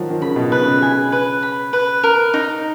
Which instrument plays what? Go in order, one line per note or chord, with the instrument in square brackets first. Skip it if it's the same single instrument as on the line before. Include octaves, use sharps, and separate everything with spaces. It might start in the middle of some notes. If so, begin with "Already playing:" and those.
Already playing: [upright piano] D#3 F3 F#3
D#3
[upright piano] C#3 [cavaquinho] B5
[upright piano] B2
[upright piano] C#3 [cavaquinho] B4
[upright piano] C#3
[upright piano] C#3 [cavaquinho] G#5
[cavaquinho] B4
B5
B4
A#4
D#4